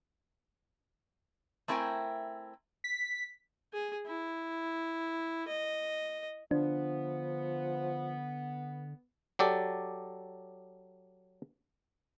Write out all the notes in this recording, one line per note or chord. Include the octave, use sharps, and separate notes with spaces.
A3 C4 E4 A#4 G5 G#5
B6
G#4
E4
D#5
D3 F3 B3 D4
F#3 G4 A4 D5